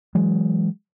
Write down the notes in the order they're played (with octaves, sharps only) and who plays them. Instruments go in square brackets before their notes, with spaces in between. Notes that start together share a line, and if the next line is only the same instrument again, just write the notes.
[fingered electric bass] E3 F#3 G#3